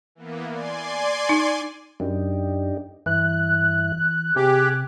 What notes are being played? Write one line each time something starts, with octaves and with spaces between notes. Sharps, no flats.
E3 A#3 B3
D5 G#5 C6
D#4
F#2 D4 D#4 G4
G2 E3 E4 F#6
C3 G4 G#4 G#5